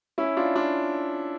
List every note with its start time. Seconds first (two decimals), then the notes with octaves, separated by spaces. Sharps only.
0.18 C#4 E4
0.37 D4 F4
0.55 D4 F4